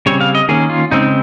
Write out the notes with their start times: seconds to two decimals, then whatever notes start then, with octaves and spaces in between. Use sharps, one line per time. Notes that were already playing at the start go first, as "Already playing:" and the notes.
0.06 C#3 G3 C4 C#5
0.21 F5
0.35 D#5
0.49 D#3 A#3 C#4 G#4
0.70 F4
0.91 C#3 G#3 C4 D#4